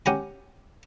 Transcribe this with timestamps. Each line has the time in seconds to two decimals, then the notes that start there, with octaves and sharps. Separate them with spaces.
0.06 C#4 G4 F#5 A#5 B5